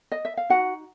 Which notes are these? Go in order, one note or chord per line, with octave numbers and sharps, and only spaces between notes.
D#5
E5
F5
D#4 F#4 F#5